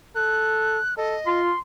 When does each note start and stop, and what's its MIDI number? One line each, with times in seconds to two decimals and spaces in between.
0.16 0.79 69
0.16 0.94 90
0.97 1.17 69
0.97 1.41 75
1.26 1.51 65
1.26 1.59 84